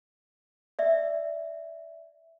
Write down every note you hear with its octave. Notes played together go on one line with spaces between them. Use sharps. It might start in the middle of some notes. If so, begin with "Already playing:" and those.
D5 E5